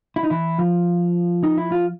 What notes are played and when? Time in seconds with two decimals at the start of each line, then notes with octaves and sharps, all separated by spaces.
0.16 E4
0.24 D#4
0.30 E3 E4
0.58 F3 F4
1.44 D#4
1.58 E4
1.72 F4